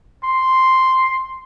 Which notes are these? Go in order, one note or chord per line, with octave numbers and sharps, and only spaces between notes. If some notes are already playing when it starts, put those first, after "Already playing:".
C6